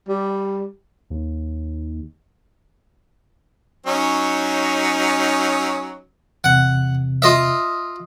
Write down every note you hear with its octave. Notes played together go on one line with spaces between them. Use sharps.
G3
D#2
F#3 C#4 D#4
E2 C3 F#5
F4 D#5 E5